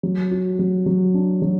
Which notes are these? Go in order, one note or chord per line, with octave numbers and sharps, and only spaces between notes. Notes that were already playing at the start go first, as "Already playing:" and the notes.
F#3
F#4
F#3
F#3
D4
F#3